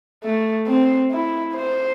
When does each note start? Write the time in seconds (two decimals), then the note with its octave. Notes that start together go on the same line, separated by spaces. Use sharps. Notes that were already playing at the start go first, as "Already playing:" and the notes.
0.24 A3
0.67 C4
1.11 E4
1.54 C5